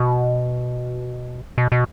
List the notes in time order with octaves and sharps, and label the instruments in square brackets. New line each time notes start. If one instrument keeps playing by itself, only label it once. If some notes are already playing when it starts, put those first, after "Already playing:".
Already playing: [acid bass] B2
B2
B2